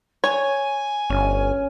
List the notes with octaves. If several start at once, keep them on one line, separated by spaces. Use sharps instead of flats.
C#5 G#5
G1 C#4